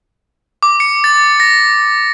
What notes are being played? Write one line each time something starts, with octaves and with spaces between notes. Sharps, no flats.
D6
C#7
A6
A#6